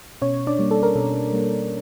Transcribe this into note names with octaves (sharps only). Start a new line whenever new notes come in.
B2 C#4 C#5
D4 D5
G3 A#3
A4
A#4
B2 A4
G3 A#3